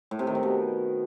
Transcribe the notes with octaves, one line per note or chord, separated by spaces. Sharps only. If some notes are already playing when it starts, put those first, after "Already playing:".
A2
C3
D#3
C3
B2